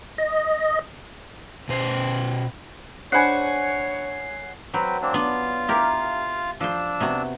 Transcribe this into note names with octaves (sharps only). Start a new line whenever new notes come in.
D#5
B2 C5
D4 C5 C#5 F#5 G#5 B5 C7
F#3 C4 B4 G5
A#3 C4 D4
B3 D4 F4 F5
E4 G4 A#4
F3 D4 C5 E6
C3 B3 F#4